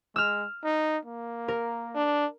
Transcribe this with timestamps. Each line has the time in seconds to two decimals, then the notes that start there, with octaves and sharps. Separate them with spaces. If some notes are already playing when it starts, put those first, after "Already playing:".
0.16 G#3 E6 F6
0.64 D#4
1.05 A#3
1.48 A#4
1.95 D4